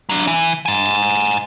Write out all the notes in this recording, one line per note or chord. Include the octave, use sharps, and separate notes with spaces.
F#3 D4
E3
G#5 A#5